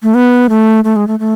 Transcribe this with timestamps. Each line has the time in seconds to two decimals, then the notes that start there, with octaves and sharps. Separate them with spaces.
0.03 A3
0.14 B3
0.49 A3
0.84 A3
0.96 G#3
1.08 A3
1.19 A3